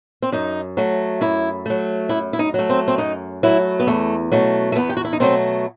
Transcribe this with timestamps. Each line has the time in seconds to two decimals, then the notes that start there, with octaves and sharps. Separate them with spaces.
0.22 C4
0.32 F#2 D#4
0.77 F#3 A3
1.21 F#2 E4
1.66 F#3 A3
2.09 F#2 E4
2.33 E4
2.39 D#4
2.54 F#3 A3
2.70 C4
2.88 C4
2.98 F#2 D#4
3.43 F#3 A3 E4
3.80 B3
3.87 E2 A3
4.32 B2 F#3 A3
4.72 A3
4.76 E2 B3
4.89 G4
4.97 F#4
5.05 E4
5.13 D#4
5.20 B2 F#3 A3 C4